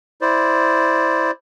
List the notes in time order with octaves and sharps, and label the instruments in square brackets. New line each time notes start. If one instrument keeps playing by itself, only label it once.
[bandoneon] E4 C5 D5